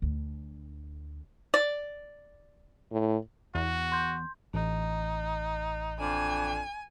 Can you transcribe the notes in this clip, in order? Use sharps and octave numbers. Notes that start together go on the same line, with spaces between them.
D2 D3
D5
A2
E2 F#4
C6 G6
A1 D#4
F2 D4 G#5